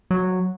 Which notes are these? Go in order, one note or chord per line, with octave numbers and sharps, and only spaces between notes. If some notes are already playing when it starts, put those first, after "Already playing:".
F#3